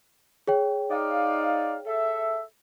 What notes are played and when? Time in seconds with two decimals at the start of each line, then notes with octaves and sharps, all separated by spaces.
0.47 G#4 C#5 G5
0.91 D#4 D5 F5
1.86 A4 E5